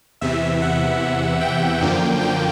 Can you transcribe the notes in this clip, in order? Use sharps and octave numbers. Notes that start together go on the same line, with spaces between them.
E2 C3 E3 E5
F#5
G5
F#2 D3 F3 A#3
G5